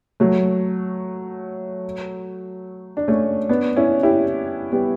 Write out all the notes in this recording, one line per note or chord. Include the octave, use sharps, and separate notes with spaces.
F#3 A3
D4
A3 C#4
B3 D4
C#4 E4
E4 G4
G3 B3